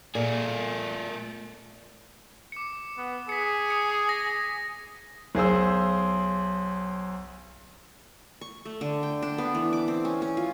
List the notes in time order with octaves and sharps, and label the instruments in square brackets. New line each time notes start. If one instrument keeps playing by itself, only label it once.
[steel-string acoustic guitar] A#2 [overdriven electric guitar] A3 G#4
[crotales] D6 C#7
[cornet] B3
[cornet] G#4 [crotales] B6 C#7
[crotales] D#6 C#7
A#6
[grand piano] B1 G#4 C5 E6
[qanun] C#6
A3
D3
G5
D4
B3
E3
D6
C4
C#4
C#4
F4